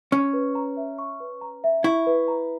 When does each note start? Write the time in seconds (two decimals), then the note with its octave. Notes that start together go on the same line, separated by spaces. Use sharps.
0.12 C#4 C#6
0.33 B4
0.55 A#5
0.77 E5
0.98 C#6
1.20 B4
1.41 A#5
1.64 E5
1.84 E4 C#6
2.07 B4
2.28 A#5